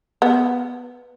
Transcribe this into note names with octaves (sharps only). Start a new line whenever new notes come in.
B3